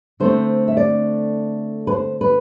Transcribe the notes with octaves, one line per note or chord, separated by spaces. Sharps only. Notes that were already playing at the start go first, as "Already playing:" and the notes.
D3 A3 C4 C5
E5
D5
B4
C5
B4